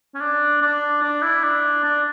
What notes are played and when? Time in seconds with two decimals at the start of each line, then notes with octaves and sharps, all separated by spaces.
0.15 C#4
0.21 D4
0.62 D4
1.03 D4
1.23 E4
1.43 D4
1.84 D4